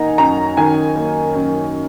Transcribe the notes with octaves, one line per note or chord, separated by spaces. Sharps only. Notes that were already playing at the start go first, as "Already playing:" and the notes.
Already playing: D#3 A#3 D#4 F#5 G#5 A#5
F#2 A#5
D#3 G#5
A#3
F#2